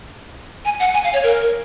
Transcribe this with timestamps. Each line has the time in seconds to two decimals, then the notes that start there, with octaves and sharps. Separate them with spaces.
0.65 G#5
0.80 F#5
0.94 G#5
1.04 F5
1.13 C#5
1.23 A#4